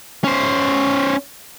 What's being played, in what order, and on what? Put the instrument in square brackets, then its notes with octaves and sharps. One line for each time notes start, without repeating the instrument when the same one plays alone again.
[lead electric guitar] C#4 C5